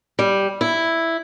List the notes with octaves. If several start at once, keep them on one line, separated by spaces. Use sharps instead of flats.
G3
E4